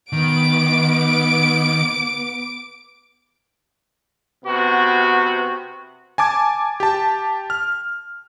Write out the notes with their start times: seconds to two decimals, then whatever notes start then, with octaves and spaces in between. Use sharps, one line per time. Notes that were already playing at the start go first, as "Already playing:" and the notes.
0.13 D#3 B3 D6 D7
4.44 C3 B3 F#4
6.18 G#5 A5 D6 G#6
6.80 G4 A5
7.50 F6